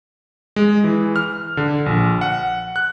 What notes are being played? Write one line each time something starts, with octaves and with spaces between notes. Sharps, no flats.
G#3
E3
F6
D3
A#1
F#5
F#6